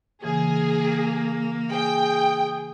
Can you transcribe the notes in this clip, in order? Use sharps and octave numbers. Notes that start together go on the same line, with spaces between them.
C#3 E3 A#3 G#4
G#4 G5